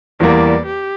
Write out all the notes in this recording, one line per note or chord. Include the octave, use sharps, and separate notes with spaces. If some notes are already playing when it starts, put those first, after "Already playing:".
E2 E3 G3 A#3 D5
G4